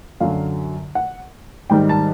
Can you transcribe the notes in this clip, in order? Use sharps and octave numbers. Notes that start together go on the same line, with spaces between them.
F#2 D3 F#3 F5
F#5
G#2 D#3 G3 G5
A5